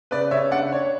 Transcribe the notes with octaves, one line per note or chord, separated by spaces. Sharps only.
C#3 B4 D5
C#3 C#5 E5
D4 D5 F#5
D4 C#5